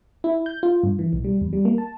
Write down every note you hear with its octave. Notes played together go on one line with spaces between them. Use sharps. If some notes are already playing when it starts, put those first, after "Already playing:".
E4
G6
F4
G2
E3
B1
G3
E2
G3
A#3
A5